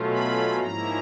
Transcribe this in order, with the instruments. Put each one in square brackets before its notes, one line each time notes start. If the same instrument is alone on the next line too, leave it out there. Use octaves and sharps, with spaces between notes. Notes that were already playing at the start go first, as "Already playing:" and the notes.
Already playing: [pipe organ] B2 F#3 A3 C#4 F4
B5
G#2 F3 A#3 C#4 E4 A#5